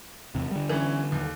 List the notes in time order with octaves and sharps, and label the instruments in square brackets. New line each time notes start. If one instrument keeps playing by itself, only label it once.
[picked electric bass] E2 C3
D3 G3
[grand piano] E3 C#4
D#2